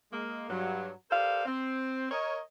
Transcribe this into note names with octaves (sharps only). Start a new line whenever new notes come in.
G#3 A#3
G2 F#3
G4 A4 A#4 C5 D5 F5
C4
A#4 C#5 D#5